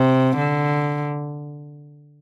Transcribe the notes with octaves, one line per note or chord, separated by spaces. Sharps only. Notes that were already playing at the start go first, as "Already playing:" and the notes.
Already playing: C3
D3